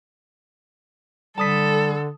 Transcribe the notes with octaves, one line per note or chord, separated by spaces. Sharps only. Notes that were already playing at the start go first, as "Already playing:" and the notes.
D3 G3 A4 A5 D#6 B6